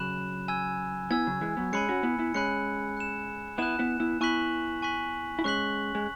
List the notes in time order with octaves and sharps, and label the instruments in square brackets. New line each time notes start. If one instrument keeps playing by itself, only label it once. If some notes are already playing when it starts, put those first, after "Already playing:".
Already playing: [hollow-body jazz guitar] C#3 F#3 [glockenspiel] B5 F#6 E7
[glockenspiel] G#5 E6 G#6
[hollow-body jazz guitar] B3 E4 [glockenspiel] G#5 E6 G#6
[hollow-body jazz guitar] C#3 F#3
E3 G#3
F#3 B3
[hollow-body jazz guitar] G#3 C#4 [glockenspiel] G#5 B5 F#6 C#7
[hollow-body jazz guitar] C#4 F#4
B3 E4
B3 E4
[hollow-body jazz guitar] G#3 C#4 [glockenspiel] G#5 B5 F#6 C#7
[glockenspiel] F#6 E7
[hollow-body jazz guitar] B3 E4 [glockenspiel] F#6 E7
[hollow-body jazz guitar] B3 E4
B3 E4
[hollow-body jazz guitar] B3 E4 [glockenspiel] G#5 C#6 F#6 B6 F#7
[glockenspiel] G#5 C#6 F#6 B6 F#7
[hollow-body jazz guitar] E4
[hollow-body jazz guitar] G#3 C#4 [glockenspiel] C#6 F#6 B6 F#7
[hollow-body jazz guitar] G#3